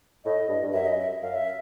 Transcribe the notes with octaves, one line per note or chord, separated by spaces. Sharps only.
A2 D#5
G2
G2
F#2 E5
D#5
E5
F#2 F5
E5